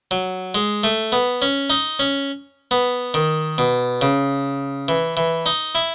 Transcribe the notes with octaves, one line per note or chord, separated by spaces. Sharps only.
F#3
G#3
A3
B3
C#4
D#4
C#4
B3
D#3
B2
C#3
E3
E3
D#4
E4